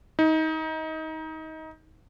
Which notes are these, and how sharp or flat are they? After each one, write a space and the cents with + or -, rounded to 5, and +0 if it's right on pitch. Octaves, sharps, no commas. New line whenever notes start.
D#4 +25